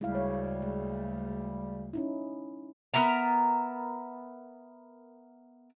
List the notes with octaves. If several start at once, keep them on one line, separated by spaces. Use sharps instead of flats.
D2 C#3 G3 G#3 E4 F5
C#5
G#3
C#4 D#4 E4
B3 A#4 E5 A#5